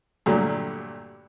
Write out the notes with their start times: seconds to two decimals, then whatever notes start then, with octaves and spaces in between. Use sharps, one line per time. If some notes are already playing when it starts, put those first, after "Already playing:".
0.26 G2 A#2 D3 F#3 A3